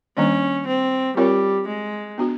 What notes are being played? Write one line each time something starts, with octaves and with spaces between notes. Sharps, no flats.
D#3 G3 A#3 C#4 D4
C4
G3 C4 F4 A#4 C#5
G#3
B3 D4 F#4